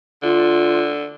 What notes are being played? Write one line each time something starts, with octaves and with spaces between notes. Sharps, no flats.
D3 F4